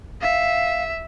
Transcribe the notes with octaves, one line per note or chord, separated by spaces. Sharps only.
E5 F5